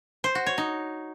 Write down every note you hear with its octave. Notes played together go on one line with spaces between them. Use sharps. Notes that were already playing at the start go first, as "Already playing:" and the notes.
C5
F#4
C#5
D#4